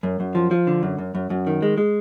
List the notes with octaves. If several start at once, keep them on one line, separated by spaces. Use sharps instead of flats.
F#2
F#2
F3
F3
D3
F#2
F#2
F#2
F#2
D#3
G#3
G#3